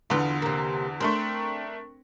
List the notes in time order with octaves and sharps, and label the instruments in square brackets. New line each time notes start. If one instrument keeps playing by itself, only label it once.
[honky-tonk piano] E2 D3 [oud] B3 F4
[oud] C3 A#3
[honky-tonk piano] A3 D4 A#4 [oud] C4